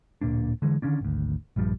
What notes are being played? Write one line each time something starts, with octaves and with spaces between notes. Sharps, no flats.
D1 A#2 A#3 D4
D3 E3 G#3
D3 D#3 C#4 D4
G#1 D2
A#1 G2 F3 G3